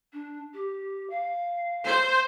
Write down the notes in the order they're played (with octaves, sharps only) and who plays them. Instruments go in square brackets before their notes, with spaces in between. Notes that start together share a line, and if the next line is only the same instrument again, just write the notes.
[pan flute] D4
G4
F5
[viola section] C5